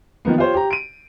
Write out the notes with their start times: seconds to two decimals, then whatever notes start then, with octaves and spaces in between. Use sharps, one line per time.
0.25 D#3 F3 A#3 B3
0.38 F4 G4 C5 C#5
0.54 G4 A#5
0.71 D7 D#7